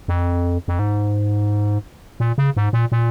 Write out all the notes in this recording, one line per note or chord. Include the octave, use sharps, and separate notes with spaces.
F2
F2
G#2
A#2
C#3
G#2
A#2
A#2